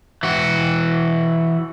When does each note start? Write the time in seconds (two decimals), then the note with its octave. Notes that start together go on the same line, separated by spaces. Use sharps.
0.23 E3 F#4